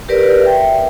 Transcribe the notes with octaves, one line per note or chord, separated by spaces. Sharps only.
G4 A#4 B4 D5
E5 G5